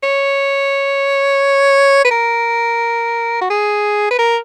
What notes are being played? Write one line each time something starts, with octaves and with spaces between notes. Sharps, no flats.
C#5
B4
A#4
F#4
G#4
B4
A#4